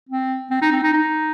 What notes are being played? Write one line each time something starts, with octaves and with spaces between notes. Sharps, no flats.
C4
C4
D#4
C4
D#4
D#4